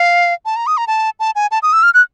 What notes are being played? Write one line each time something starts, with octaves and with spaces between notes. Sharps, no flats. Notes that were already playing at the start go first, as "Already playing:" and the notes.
Already playing: F5
A5
A#5
D#6
A#5
A5
A5
G#5
A5
D#6
E6
F6
F#6